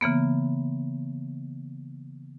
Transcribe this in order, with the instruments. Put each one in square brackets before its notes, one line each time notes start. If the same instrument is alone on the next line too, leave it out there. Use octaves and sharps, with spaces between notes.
[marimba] C#3 E3 A#3 B3